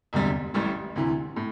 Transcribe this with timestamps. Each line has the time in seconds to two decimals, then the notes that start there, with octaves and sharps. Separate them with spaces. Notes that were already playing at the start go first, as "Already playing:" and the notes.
0.13 E1 D2 C3 G3
0.54 A1 A2 G3
0.96 D2 C3 E3
1.36 A2